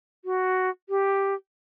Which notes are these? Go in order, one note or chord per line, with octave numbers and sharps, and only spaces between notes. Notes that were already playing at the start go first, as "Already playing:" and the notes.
F#4
G4